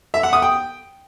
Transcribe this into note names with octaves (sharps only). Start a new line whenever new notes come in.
E5
F#5
D#6
G5